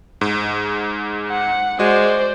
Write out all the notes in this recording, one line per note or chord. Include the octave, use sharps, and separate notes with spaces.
G#2
F#5
G#3 F#4 C5 D5